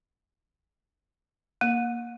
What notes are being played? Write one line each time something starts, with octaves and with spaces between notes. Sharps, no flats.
A#3